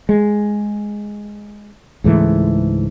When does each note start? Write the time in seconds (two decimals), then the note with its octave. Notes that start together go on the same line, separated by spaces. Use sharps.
0.09 G#3
2.04 C#2 G#2 E3 A3